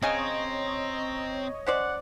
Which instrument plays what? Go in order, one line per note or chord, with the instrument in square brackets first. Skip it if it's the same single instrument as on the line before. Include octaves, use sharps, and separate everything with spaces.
[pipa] C#3 G#5 [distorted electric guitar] C4 [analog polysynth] C#5 D#5 [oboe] A#5
[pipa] C#4 C5 D5 [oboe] F#5